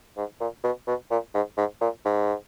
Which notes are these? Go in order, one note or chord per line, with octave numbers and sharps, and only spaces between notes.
G#2
A#2
B2
B2
A#2
G#2
G#2
A#2
G#2